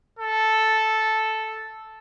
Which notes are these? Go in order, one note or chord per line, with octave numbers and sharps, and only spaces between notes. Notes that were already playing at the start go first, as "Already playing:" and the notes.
A4